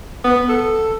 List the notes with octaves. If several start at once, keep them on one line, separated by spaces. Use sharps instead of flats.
B3
A4